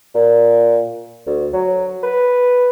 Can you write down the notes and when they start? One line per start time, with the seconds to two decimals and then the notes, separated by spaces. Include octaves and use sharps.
0.15 A#2
1.27 D2
1.53 F#3
2.03 B4